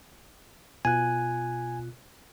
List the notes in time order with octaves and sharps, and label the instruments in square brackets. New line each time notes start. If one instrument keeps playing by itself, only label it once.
[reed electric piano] B2 F4 F#6 [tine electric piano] G#5